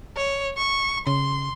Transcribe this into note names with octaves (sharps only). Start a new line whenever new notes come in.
C#5
C#6
C#3 C6